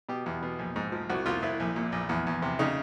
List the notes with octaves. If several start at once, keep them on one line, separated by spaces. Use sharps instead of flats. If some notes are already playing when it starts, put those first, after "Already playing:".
B2 G4
E2
B2
A#1
G#2
F3
C2 F#4
C2 F4
C2 E4
A#1
A#2
A#1
E2
E2
C3
C#3 D#4